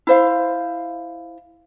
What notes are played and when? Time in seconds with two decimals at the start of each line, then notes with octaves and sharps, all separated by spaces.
0.07 E4 C5 F5